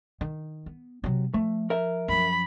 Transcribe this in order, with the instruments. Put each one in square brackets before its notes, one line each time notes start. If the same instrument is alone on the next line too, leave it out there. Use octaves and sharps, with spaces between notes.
[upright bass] D#3
B3
C3 F#3
[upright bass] F3 [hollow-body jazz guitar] A3
[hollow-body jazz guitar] A#4 E5
[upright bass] F#2 F3 [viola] B5